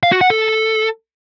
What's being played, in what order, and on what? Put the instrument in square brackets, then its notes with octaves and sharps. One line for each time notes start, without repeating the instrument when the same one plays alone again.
[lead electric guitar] F5
F#4
F#5
A4